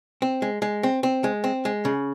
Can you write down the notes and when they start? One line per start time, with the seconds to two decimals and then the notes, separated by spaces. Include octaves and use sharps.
0.22 C4
0.42 G#3
0.62 G#3
0.83 C4
1.03 C4
1.24 G#3
1.44 C4
1.65 G#3
1.85 C#3